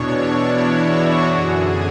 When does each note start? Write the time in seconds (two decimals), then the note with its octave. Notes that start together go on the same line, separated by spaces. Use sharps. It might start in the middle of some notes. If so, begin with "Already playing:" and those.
Already playing: E2 B2 D4 C#5
0.21 E4
0.74 F#4
1.25 F#2 D3 G#4